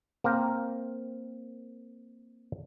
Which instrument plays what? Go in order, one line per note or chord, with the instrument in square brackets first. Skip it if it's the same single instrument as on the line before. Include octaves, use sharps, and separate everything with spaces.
[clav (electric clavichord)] A#3 C4 A#4 G5